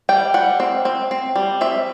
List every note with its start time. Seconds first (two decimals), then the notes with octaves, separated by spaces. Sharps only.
0.09 G3 G5
0.34 G3 F#5
0.60 C4
0.85 C4
1.11 C4
1.36 G3
1.61 C4 E5